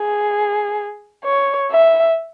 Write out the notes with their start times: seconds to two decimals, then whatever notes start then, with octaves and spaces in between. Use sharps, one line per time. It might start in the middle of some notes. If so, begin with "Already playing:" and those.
Already playing: G#4
1.24 C#5
1.71 E5